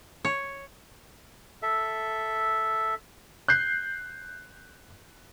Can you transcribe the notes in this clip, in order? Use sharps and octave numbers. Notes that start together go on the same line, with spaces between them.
C#5
A4 E5
F#6 G6 C7